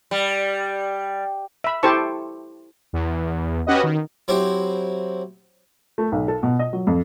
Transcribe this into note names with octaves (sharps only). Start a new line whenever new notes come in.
G3
E5 B5
E4 G4 A4 C5 A5 C#6
E2
C#4 F#4 G4 B4 D#5
D#3
F#3 C4 E4 G4
A3
B1
A4
B2
D#5
F#3
F2